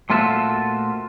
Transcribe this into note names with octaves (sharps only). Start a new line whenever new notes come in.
A#2 A3 C4 F4 F#4 E5